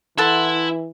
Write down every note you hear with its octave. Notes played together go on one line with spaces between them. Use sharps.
E3 E4 A4 E5 F#5 C6